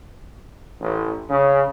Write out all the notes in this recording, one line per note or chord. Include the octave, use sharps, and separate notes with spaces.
A1
C#3